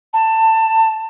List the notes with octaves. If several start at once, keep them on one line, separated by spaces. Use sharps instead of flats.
A5